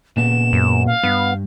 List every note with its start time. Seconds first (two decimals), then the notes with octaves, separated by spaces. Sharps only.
0.17 A#2 C#3 B3 E7
0.53 F#2
0.87 F5
1.03 G2 B3